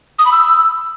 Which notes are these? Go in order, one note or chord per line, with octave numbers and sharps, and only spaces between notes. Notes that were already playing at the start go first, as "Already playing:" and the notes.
D#6
B5
E6